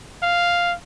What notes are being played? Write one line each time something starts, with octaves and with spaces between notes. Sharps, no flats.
F5